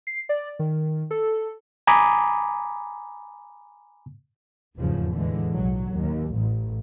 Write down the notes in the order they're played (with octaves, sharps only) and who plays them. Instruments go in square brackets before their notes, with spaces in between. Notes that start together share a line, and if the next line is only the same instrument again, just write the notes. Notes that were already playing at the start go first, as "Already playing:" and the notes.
[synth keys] C7
D5
D#3
A4
[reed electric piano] G#5 A#5 B5 D6 D#6
[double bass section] F1 E2 G#2 C#3 F3
A2 D3 E3 G#3
B1 F#3
D#2
A1